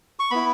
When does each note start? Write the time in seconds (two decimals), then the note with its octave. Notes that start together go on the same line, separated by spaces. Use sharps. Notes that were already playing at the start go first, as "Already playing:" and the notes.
0.19 C#6
0.31 B3 E4 B5